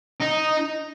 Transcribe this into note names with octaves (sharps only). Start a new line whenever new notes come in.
D#4